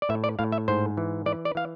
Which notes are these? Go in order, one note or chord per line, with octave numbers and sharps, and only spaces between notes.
D5
A2 E5
D5
A2 F5
E5
G#2 C5
E3
E3 D5
D5
E3 F5